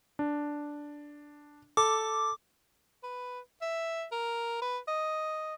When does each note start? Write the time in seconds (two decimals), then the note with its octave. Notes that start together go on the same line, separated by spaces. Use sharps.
0.19 D4
1.77 A4 D6
3.04 B4
3.62 E5
4.12 A#4
4.62 B4
4.88 D#5